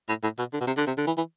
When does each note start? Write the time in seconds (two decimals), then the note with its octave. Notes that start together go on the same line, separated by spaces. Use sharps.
0.09 A2
0.23 A2
0.38 B2
0.53 D3
0.61 B2
0.67 C3
0.77 D3
0.87 C3
0.97 D3
1.07 E3
1.17 E3